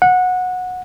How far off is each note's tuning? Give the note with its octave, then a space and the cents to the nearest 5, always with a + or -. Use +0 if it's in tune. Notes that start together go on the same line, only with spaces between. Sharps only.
F#5 -15